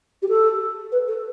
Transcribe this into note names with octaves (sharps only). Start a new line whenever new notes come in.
G4
A4
B4
A4